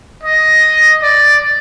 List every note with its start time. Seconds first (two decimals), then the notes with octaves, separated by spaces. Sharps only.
0.23 D#5
1.02 D5